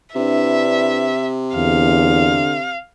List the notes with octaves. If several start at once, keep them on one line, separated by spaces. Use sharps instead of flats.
C3 D4 E4 B4 E5
E2 D3 F5